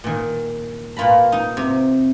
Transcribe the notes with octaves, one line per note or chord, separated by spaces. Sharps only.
A#2 D#3
A#2 A#3 F4 A#5 B5
D#4
C3